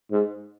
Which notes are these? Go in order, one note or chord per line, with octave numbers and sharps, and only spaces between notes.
G#2